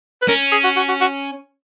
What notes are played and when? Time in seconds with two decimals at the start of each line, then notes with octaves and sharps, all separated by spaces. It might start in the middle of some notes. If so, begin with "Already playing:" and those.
0.22 B4
0.28 C#4 A#4
0.52 G#4
0.64 F#4
0.76 F#4
0.89 F#4
1.01 F#4